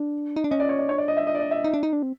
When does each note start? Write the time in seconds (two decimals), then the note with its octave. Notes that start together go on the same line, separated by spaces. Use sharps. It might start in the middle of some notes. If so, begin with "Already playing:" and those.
Already playing: D4
0.36 D#4
0.44 D4
0.51 C#4 D#5
0.60 D5
0.69 C#5
0.79 D5
0.89 D4 C#5
0.98 D5
1.08 D#5
1.17 E5
1.27 D#5
1.35 D5
1.39 D#5
1.51 E5
1.64 D#4
1.74 D4
1.83 D#4
1.93 D4
2.03 C4